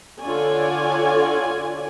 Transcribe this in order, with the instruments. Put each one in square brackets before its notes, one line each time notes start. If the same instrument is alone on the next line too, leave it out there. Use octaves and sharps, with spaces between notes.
[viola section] D3 F4 F#4 C#5 D5 G#5